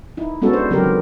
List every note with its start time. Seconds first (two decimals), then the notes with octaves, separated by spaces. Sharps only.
0.17 D#4 E4
0.42 G#3 B3 C#4 F#4 A4
0.53 D4 C5
0.70 C#3 F#3 C4 G4 A#4
0.83 D#3